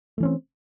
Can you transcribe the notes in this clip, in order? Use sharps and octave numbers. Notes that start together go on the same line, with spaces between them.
E3 A3 C4 C#4